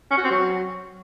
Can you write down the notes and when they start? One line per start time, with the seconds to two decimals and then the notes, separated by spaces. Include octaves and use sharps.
0.11 C#4
0.17 F#4
0.24 C4
0.31 F#3